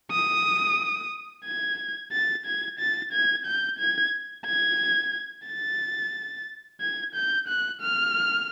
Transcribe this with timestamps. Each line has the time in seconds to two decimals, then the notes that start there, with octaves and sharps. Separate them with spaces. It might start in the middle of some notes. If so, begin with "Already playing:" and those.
0.11 D#6
1.45 G#6
2.12 A6
2.45 G#6
2.79 A6
3.13 G#6
3.46 G6
3.79 G#6
4.46 G#6
5.47 A6
6.81 G#6
7.15 G6
7.48 F#6
7.81 F6